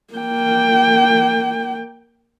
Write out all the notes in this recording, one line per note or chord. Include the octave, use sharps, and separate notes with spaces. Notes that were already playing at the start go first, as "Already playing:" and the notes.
A#3 G5